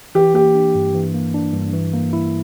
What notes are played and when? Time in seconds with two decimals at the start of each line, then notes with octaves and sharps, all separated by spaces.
0.15 E3 G4
0.34 A#3 G4
0.55 D4
0.75 G2
0.94 E3
1.14 A#3
1.34 D4
1.53 G2
1.73 E3
1.93 A#3
2.13 E4